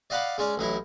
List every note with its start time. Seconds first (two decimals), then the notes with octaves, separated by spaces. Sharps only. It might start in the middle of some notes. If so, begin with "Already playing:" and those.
0.10 D5 D#5 F5 F#5 B5 D6
0.38 G#3 C#4 D5
0.57 A1 F#3 D#4 E4